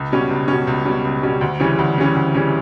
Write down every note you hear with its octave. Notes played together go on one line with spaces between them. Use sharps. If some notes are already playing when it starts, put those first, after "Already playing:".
Already playing: C#2
B2 G3 C#4
C#2
B2 G3 C#4
C#2
B2 G3 C#4
C#2
B2 G3 C#4
D2
C#3 E3 G3 C#4
D2
C#3 E3 G3 C#4
D2
C#3 E3 G3 C#4